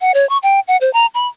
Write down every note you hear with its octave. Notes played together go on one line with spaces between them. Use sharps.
F#5
C#5
C#6
G5
F#5
C5
A#5
B5